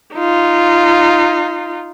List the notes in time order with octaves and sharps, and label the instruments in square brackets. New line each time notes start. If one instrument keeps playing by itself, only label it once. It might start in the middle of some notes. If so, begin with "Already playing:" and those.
[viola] D#4 F4